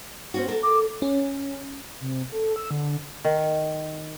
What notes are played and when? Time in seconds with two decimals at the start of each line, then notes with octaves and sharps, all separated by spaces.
0.34 C4 C#4 F#4
0.48 A4 A#4
0.63 D6
1.02 C#4
2.00 C3
2.32 A4
2.56 E6
2.71 D3
3.25 D#3